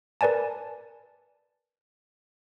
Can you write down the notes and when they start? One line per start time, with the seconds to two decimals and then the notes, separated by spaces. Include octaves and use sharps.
0.21 A#4 B4 D5 G#5 A5